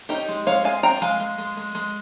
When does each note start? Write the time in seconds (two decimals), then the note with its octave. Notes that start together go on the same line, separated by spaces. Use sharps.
0.09 C#4 D#4 G4
0.28 G#3
0.47 G#3 C#5 F5
0.64 G#3 F5 G#5
0.83 C#4 G5 A#5
1.02 G#3 F5 G#5
1.20 G#3
1.38 G#3
1.57 G#3
1.75 G#3